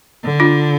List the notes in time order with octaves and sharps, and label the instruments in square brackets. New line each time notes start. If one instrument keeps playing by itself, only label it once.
[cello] D3
[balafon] D4 F4